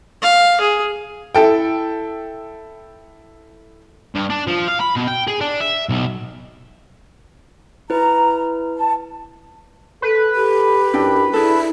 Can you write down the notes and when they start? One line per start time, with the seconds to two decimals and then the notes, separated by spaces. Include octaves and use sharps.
0.22 F5
0.61 G#4
1.35 E4 A4 G5
4.15 G2
4.30 D4
4.47 F3
4.68 F5
4.80 B5
4.96 B2
5.07 G5
5.27 G#4
5.41 D4
5.61 E5
5.89 B1
7.90 E4 B4 A#5
8.77 A5
10.02 A4 B4
10.35 G4 A4
10.94 F#2 D4 E4 G5
11.34 D4 E4 G#4 A4